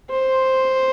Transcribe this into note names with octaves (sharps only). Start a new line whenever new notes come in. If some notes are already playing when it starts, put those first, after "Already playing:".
C5